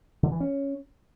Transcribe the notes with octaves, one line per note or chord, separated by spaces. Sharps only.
D3
E3
C#4